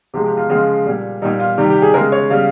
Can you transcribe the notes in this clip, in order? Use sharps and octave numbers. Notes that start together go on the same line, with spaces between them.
C3 F3 G#3 G4
G4
F4
C#3 F3 G#3 F4
A#2 G3
A#2 G3 D#4
F4
C3 D#3 G3 G4
G4
G#4
C#3 G#3 A#4
C#5
C#3 G3 F5